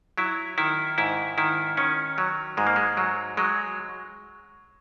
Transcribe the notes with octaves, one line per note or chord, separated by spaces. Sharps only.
F#3 E4
D#3 E4
G#2 E4
D#3 E4
D#3 C#4
F#3
G#2 G#3
A#3
G#3
F#3
F#3 G#3